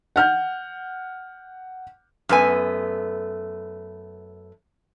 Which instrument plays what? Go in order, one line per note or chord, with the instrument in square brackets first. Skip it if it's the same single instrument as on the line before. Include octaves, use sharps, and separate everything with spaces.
[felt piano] F#5 F6 G6
[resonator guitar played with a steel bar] F#2 A3 B3 B4 G#5